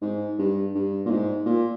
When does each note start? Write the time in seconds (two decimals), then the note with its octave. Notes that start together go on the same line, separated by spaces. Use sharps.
0.02 G#2
0.38 G2
0.75 G2
1.05 A#2
1.11 G#2
1.46 A#2